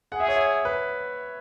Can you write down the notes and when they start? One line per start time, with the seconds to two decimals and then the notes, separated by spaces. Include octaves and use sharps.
0.12 G#4 F#5
0.20 E5
0.28 C#5
0.36 E5
0.65 B4